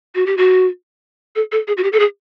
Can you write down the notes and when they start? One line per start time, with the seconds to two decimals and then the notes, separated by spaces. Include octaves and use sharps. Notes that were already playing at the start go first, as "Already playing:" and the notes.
0.15 F#4
0.26 G4
0.37 F#4
1.36 A4
1.52 A4
1.68 G#4
1.77 F#4
1.84 G4
1.93 A4
2.00 G#4